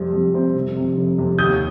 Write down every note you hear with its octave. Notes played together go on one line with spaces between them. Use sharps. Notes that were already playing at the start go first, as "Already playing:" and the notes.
Already playing: F2 C3 G3 C4
F2
C3 G3 C4
F1
F2 C3
F1
F2 C3
D#2 D#6 G6